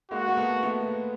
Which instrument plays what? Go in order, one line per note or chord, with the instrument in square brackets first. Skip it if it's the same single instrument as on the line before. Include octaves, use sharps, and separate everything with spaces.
[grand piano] G#3 A#3 [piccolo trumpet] F#4
[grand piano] A#3
A3 B3
A3 B3